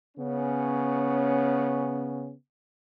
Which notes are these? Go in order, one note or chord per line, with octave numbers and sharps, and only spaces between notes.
C#3 B3 C#4